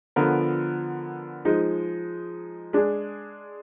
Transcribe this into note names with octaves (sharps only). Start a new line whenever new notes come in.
D3 F3 B3 F4 A#4
F3 G#3 D#4
G#3 D4 G#4